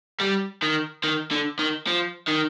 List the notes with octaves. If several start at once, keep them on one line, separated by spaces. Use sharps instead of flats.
G3
D#3
D#3
D3
D#3
F3
D#3